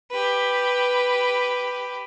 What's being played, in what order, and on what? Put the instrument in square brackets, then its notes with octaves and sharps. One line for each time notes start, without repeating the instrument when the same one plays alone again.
[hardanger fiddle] G4 B4